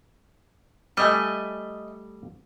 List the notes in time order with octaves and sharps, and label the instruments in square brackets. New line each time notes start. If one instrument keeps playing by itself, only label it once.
[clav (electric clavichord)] G3 A3 [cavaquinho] D#5 E5 G#5